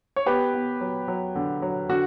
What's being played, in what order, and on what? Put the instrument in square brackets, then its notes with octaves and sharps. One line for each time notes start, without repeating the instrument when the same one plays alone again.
[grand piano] C#5
B3 G4 B4
B3
F#3
F#3
D3
F#3
D3 F#4